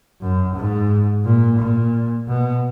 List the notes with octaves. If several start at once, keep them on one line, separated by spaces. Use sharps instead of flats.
F#2
G#2
A#2
A#2
B2